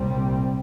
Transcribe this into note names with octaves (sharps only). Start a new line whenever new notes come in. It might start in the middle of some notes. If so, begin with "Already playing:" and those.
Already playing: C2 A#2 G3 C4